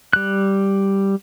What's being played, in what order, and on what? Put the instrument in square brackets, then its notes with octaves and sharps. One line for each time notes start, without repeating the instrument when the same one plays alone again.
[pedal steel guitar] G3 F#6